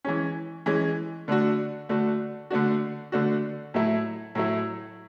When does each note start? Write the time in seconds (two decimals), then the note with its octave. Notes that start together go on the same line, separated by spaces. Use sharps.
0.05 E3 G#3 C#4
0.66 E3 G#3 C#4
1.28 D3 A3 D4 F#4
1.89 D3 A3 D4 F#4
2.50 D3 A3 D4 F#4
3.12 D3 A3 D4 F#4
3.74 A2 F#3 A3 E4
4.35 A2 F#3 A3 E4